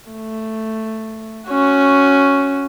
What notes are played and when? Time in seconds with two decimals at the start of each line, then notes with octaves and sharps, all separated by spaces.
0.11 A3
1.48 C#4 F#4